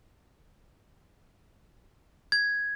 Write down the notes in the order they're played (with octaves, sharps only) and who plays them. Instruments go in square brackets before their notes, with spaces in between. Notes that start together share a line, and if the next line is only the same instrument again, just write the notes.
[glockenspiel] G#6